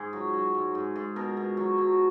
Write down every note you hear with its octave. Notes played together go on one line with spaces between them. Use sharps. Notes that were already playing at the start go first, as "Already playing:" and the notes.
Already playing: G#2 G#4
F#3
F#3
G#2
G#2
G#2
B2 A#4
B2
F#3
F#3